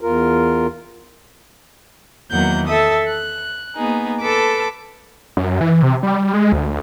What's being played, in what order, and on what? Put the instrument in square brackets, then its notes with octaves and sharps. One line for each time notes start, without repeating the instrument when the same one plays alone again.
[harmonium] E2 F4 A#4
[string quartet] E2 D#3 F#3 A#3 F#5 G6
A4 E5 A5 D#6
F#6
A#3 B3 D#4 G#4
A4 B4 A5 D6 E6
[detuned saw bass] F#2
E3
C3
G3
G#3
D2